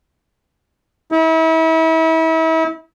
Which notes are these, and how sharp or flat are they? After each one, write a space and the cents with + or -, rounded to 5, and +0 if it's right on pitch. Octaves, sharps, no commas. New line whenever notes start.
E4 -35